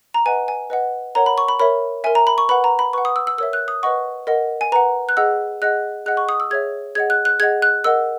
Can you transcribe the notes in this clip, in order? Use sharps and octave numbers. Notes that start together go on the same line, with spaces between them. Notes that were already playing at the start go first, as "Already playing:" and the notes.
A#5
B4 D#5 F#5 G#5
G#5
B4 D#5 F#5
A#4 C#5 F#5 A#5
B5
C#6
B5
A#4 C#5 E5 B5
A#4 E5 G#5
A#5
B5
C#6
B4 F#5 B5
A#5
B5
B4 F#5 C#6
D#6
E6
E6
A#4 C#5 E5 E6
F#6
D#6
B4 D#5 F#5 C#6
A#4 D#5 F#5
G#5
B4 F#5 A#5
F#6
G#4 D#5 F#5 E6
G#4 D#5 F#5 F#6
G#4 D#5 F#5 F#6
C#6
D#6
E6
G#4 C#5 E5 G#6
G#4 D#5 F#5 G#6
F#6
F#6
G#4 D#5 F#5 G#6
F#6
A#4 D#5 F#5 E6